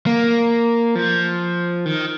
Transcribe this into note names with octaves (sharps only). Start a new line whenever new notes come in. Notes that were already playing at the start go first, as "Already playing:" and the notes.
A#3
F3
D#3